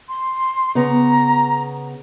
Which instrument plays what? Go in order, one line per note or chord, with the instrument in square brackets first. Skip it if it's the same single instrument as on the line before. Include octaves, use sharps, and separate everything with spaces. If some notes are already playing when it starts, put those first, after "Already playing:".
[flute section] C6
[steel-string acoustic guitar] C#3 B3 [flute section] A#5